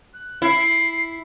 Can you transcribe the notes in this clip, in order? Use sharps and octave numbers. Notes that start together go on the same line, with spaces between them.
F#6
E4 C7